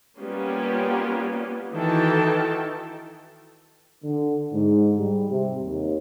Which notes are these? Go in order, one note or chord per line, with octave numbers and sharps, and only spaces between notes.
G3 A#3 B3 C#4 F4 G4
D#3 E3 F#4 A4 G5 A5
D3
G#2
G3
C3
D#2